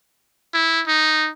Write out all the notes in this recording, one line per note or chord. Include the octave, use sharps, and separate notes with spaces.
E4
D#4